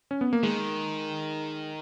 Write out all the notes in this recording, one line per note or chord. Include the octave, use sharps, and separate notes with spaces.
C#4
B3
A#3
D#3 G#3